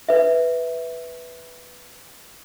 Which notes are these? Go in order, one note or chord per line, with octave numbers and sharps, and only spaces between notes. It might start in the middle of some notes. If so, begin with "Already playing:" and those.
B4 E5